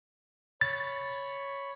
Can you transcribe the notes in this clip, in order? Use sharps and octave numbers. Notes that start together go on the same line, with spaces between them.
C#5 B5 A6